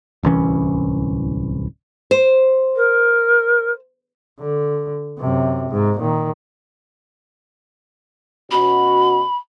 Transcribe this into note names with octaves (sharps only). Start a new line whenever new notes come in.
D1 C2 E3 C#4
C5
A#4
D3
F#2 C3
G#2
A#2 D#3
B2 C#4 F#4 B5